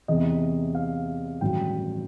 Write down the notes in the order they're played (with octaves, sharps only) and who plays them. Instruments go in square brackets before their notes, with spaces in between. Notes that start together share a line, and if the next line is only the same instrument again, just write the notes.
[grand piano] E2 C3 E3 D#5
F5
A1 G2 D#3 F#3 G5